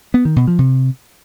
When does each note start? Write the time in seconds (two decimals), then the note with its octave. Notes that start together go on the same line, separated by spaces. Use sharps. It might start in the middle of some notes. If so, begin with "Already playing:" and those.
0.14 B3
0.25 D#3
0.36 B2
0.47 F3
0.59 C3